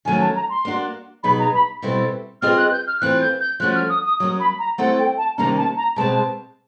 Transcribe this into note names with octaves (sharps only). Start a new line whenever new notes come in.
D#3 F#3 A3 C#4 G#5
A5
A#5
C6
A#3 D4 F#4
B2 F#3 B3 D#4 G#4 B5
A#5
B5
B2 G3 C4 E4 A4
C4 F4 G#4 B4 D#5 F6
F#6
G6
F6
E3 A3 C4 F4 F#6
G6
G6
F3 A3 C#4 F#4 F#6
F6
D#6
D#6
F#3 A#3 C#4 D#6
B5
A#5
A3 C4 E4 A4 F#5
G5
A5
C3 D#3 G3 A#3 C#4 A#5
A5
A#5
B2 G#3 C4 A5